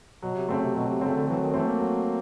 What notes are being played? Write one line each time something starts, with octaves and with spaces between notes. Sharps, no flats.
B2 F#3
C3
C#3 A3 C4
C3
B2 F#3
C3
C#3 A3 C4
D3
E3 F#3
D#3
E3 A3 C4
A#3
F#3